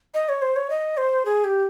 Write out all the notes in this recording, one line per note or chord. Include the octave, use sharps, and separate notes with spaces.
D#5
C#5
C5
C#5
D#5
C5
G#4
G4